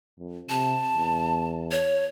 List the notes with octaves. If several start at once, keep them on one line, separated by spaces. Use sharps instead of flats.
F2
C3 A5
E2
C#5